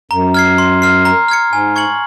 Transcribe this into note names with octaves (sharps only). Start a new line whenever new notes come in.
F#2 A#5
F6 G#6 C7
C6
F6 C7
A#5
F6 G#6 C#7
G#2 G#5
C#6 G#6 C#7 F#7